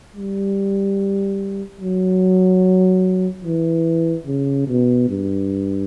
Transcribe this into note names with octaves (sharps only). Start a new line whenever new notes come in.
G3
F#3
E3
C#3
B2
G2